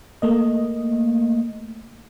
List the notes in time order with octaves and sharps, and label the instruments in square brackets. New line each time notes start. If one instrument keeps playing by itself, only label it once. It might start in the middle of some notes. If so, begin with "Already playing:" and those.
[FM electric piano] A3 A#3 D#5